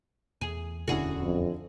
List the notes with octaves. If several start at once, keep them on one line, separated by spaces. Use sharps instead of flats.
E2 G#4
D1 E2 D3 C#4 E4 F#4 G#4
F2